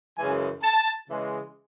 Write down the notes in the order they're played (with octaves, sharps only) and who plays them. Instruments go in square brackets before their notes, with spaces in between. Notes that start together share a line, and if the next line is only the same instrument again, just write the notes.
[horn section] F#2 C#3 E3 G#3 G#5
A5
C#3 E3 G#3